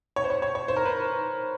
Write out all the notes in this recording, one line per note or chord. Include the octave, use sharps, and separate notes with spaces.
C#5
C5
C#5
C#5
C#5
C5
A#4
B4